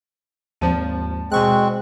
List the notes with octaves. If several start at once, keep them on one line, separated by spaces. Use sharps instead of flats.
G#1 D#2 F3 A5 D#7
B2 G#3 C4 C#6 F#6